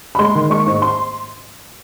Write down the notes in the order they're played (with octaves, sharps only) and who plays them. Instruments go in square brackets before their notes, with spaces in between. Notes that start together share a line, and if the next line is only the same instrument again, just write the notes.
[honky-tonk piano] B5
G#3 C6
D#3
G#3 C#6
G#2
C6